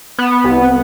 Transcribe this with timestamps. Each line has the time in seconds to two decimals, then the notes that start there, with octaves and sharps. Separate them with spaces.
0.19 B3
0.44 C2